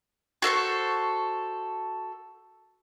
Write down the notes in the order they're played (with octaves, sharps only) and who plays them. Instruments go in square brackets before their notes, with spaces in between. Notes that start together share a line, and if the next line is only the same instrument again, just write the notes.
[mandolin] F#4 A4 C5 C#6